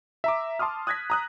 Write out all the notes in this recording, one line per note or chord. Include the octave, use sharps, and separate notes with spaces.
E5 A#5 D6
A5 C6 D6 D#6 F6
D#6 F#6 G#6 A#6 B6
A#5 D#6 F#6